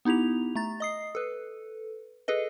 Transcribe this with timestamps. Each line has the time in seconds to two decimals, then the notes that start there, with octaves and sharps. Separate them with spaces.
0.05 B3 D#4 E4 G4 F7
0.55 A3 A#5 A6
0.80 D#5 D#6 C7
1.15 A4 B4
2.28 G#4 A4 B4 D#5